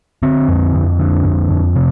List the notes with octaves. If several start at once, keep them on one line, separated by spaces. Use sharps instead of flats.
D3 C4
F2
F2
D3
F2
F2
C3